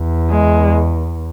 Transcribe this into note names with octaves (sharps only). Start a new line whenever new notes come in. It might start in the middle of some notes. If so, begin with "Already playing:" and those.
Already playing: E2
G#3